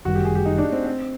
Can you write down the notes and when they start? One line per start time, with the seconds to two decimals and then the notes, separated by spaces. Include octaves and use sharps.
0.05 G1 F#2 D#3 G3 F#4
0.15 G4
0.25 G#4
0.35 G4
0.45 D#4
0.58 D4
0.72 C4
0.85 C4